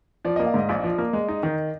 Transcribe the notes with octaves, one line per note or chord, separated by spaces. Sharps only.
F3 D5
D#5
A#3
F5
G#2 D#5
A#1 D5
F3
A#3
G#3
D#4
D#3